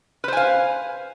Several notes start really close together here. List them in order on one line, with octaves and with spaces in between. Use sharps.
B4 C5 G#5 F5